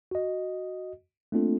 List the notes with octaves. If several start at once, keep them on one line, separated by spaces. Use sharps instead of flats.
F#4 D#5
A3 A#3 C4 D4 F4 A4